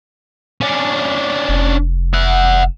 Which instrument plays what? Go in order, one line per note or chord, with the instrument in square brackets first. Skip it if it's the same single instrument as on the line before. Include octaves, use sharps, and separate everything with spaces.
[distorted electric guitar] C#4 D4
[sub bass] F1
[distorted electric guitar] E5 F#5